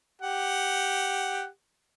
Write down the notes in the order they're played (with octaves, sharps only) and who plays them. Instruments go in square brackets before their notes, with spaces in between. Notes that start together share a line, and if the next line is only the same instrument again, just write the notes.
[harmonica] G4 F#5